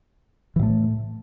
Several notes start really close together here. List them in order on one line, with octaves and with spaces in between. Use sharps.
E3 A2 A3